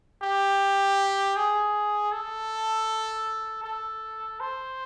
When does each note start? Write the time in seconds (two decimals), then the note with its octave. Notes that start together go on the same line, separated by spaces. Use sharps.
0.22 G4
1.37 G#4
2.12 A4
3.64 A4
4.40 C5